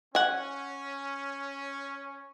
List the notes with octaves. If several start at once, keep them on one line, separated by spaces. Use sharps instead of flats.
C#4 F#5 G#5